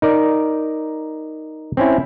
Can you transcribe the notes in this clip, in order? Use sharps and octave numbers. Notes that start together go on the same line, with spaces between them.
D#4 A#4 D5
C4 C#4 E4